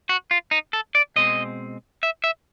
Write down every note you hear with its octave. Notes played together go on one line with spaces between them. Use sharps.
F#4
F4
D#4
A4
D5
B2 G#3 C4 D#5
E5
E5